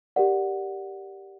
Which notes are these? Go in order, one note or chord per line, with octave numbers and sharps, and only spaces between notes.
G4 A#4 D5 F#5